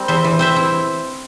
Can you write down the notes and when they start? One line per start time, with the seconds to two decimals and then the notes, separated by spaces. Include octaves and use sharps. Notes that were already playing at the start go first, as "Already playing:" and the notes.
Already playing: G3 C4 A#4
0.08 E2 C5 E5
0.24 E3
0.39 C4 C5 E5
0.56 E4